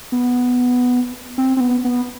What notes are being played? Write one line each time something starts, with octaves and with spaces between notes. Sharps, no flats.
B3
C4
C4
B3
B3